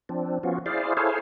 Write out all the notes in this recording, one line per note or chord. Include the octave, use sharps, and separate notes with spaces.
F3 C4 D4
F3 B3 C#4 F4 F#4
E4 G#4 C5 D5 F5
E4 G#4 A4 C5 C#5 F5